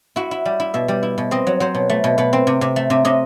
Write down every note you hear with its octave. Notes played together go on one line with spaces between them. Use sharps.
E4 F#4
E4
G3
E4
B2 E5
G3
E4
B2
C4 D#5
F#3
F#3 C5
B2
A3
B2
B2 B4
C4
C3
C3
A3
C3
C3 D#5